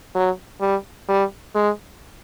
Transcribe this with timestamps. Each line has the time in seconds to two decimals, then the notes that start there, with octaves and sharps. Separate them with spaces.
0.15 F#3
0.61 G3
1.09 G3
1.55 G#3